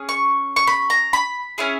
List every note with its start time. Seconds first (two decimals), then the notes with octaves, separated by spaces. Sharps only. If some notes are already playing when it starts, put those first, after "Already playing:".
Already playing: C#4 G#4
0.09 C#6
0.56 C#6
0.67 B5
0.90 A#5
1.13 B5
1.58 C#4 E4 G#4